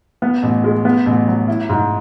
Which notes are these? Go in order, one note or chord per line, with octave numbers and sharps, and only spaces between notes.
B3
A1
G#3
B3
A1
F#3
E4
G#2